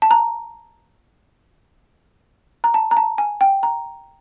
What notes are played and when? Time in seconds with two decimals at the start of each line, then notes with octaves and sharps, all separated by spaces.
0.02 A5
0.11 A#5
2.64 A#5
2.74 A5
2.91 A#5
2.97 A5
3.18 G#5
3.41 G5
3.63 A#5